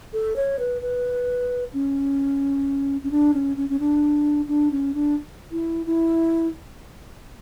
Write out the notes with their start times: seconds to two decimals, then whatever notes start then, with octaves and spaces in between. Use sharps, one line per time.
0.13 A4
0.36 C#5
0.59 B4
0.82 B4
1.73 C#4
3.03 C#4
3.11 D4
3.34 C#4
3.57 C#4
3.70 C#4
3.80 D4
4.48 D4
4.71 C#4
4.94 D4
5.52 E4
5.86 E4